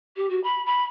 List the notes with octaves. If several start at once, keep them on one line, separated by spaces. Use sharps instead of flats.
G4
F#4
B5
B5